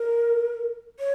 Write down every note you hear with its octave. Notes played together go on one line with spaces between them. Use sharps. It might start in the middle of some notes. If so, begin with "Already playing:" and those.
Already playing: A#4
C#5